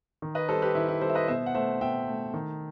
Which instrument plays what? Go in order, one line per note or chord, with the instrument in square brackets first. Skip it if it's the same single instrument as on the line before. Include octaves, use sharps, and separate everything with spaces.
[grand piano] D#3
B4 D#5
G3 A4 C5
G4 B4
D#3 E4
E4
G3 A4 C5
E5
B4 D#5
B2 C5 E5
F#5
A3 C5 E5
B2 E5 G5
A3
D#3